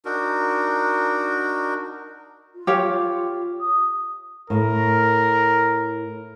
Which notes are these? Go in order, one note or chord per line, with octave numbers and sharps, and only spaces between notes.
D4 D#4 F#4 A#4
F4
G4 C#5 F5
D#6
A2 A#4